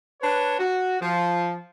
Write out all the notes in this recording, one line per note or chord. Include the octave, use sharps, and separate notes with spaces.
D4 B4 C#5
F#4
F3